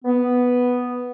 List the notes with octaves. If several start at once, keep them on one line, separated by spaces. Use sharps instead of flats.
B3